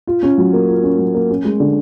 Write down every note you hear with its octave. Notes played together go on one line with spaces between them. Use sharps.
F4
C#4
F#3
A#3
F4
C#4
F#3
A#3
C#4
G#3
D3